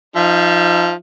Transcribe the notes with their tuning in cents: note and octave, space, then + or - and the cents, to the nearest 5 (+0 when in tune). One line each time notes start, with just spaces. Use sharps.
F3 +0 D#4 +0 E5 +45